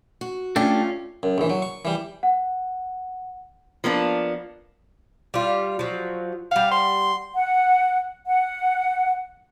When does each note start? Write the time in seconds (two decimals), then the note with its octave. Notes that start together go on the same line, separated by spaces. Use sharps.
0.21 F#4
0.56 A3 C#4 D4 F4 G4
1.23 F#2
1.38 A#1 E3
1.50 F#3
1.62 C#6
1.85 E3 G3
2.23 F#5
3.84 F3 A#3 B3 D4
5.34 G3 F4
5.79 F3 F#3
6.51 G3 F5 F#5
6.71 C6
7.35 F#5
8.27 F#5